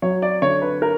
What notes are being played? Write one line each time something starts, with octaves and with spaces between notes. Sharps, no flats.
F#3 C#5
D5
D3 C#5
B4
A#4